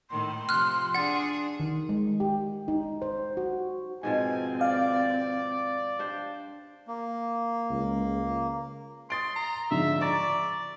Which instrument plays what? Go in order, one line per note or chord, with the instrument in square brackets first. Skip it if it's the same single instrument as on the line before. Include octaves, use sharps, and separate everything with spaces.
[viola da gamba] A2 D#3 [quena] C6
[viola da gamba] C3 F3 [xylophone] F6 F#6
[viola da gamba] D4 G#4 [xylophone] F#5 A6
[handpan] D#3
G#3
G4
D#4
C5
F#4
[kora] G#2 B2 F3 [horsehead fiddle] C4 [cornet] G#5
[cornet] D5 [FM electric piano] F5
[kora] D4 G4 C5
[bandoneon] A#3
[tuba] C#2
[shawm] C6 [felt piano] D#6 A6 D7
[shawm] A#5
[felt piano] G#2 D3 F3 [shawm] E5
[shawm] D5 [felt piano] A#5 C#6 A6